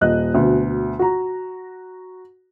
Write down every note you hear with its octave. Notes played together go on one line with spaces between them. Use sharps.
D#1 D#5 F#6
D2 B2
F#4 A#5